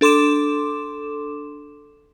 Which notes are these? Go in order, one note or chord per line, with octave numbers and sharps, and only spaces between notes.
D4 A4 C6 D6 E7